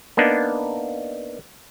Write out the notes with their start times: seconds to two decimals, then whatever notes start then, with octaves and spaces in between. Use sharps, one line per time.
0.17 A#3 B3 D4 D#4